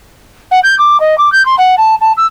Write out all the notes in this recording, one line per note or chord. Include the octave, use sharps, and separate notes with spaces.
F#5
G6
D6
D#5
D6
G6
C6
F#5
A5
A5
E6